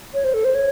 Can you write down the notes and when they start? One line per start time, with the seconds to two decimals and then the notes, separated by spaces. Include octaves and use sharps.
0.14 C#5
0.24 C5
0.34 A4
0.44 C5
0.55 C#5